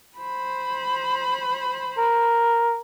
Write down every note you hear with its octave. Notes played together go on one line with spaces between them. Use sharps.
C5 B5
A#4